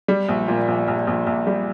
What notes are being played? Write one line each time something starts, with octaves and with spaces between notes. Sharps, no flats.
G3
A#1
A#2
A#1
A#1
A#1
A#1
G3